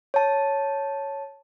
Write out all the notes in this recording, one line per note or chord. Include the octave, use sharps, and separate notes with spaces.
C#5 A5